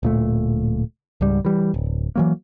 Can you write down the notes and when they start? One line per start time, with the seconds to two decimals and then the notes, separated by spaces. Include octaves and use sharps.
0.03 D1 A#2 A3
1.21 C#2 G#2 G3
1.45 E3 G3
1.74 D1
2.16 E3 F#3 A#3